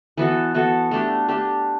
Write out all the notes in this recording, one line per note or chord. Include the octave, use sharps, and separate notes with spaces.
E3 B3 F#4 A4
E3 B3 F#4 A4
A3 D4 G4
A3 D4 G4